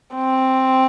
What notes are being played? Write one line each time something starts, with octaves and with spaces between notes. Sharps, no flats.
C4